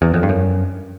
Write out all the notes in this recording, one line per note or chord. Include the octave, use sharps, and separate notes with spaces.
E2
F2
G2
F#2